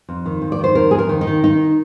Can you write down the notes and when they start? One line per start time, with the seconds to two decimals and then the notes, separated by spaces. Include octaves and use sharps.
0.09 F2
0.25 D#3
0.42 F2
0.52 D5
0.58 D#3
0.64 C5
0.75 F2 A#4
0.91 F2 G#4
0.99 A#4
1.09 D#3
1.21 D#4
1.27 D#3
1.44 D#3 D#4